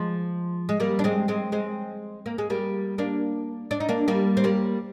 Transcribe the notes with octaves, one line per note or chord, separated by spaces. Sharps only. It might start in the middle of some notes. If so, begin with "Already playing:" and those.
Already playing: F3 G#3
G#3
G3 A#3
D4
G#3 C4
G#3 C4
G#3 C4
A#3
G#3
G3 A#3
A#3 D4
D4
D#4
A#3 D4
G3 A#3
C4
G3 A#3